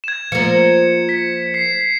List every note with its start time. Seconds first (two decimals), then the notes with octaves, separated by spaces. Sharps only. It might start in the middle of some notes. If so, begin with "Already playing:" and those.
0.04 G#6 E7
0.32 F3 A#3 C#7
1.09 B6
1.54 C7